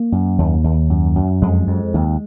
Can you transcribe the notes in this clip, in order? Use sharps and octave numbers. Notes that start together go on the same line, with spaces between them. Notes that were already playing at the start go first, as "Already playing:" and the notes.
Already playing: A#3
F#2
D#2
D#2
F#2
F#2
F2 G#3
F2
D#2